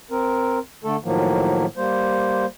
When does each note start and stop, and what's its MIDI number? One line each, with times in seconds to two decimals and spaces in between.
0.11 0.59 60
0.11 0.59 70
0.84 0.96 50
0.84 0.96 57
0.84 0.96 69
1.04 1.66 45
1.04 1.66 51
1.04 1.66 53
1.04 1.66 54
1.04 1.66 58
1.77 2.46 55
1.77 2.46 58
1.77 2.46 72